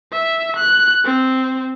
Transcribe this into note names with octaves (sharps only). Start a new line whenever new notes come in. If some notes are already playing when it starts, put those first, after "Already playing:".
E5
F#6
C4